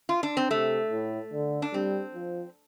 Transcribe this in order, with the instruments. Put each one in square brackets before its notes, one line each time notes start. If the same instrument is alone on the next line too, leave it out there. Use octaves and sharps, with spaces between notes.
[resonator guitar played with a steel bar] F4
D4
C4
[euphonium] C3 [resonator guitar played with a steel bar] A3
[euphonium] A2
D3
[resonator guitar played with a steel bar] D4
[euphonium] G3 [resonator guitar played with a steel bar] C4
[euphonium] F3